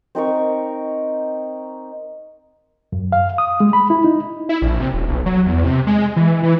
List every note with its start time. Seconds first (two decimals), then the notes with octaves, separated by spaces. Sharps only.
0.15 C4 D#4 A#4 C#6
2.92 F#2
3.12 F5
3.38 D#6
3.60 G#3
3.73 B5
3.90 E4
4.04 D#4
4.49 E4
4.62 A#1
4.80 C3
4.94 D#1
5.08 B1
5.26 F#3
5.46 E2
5.64 C3
5.87 G#3
6.16 E3
6.43 E3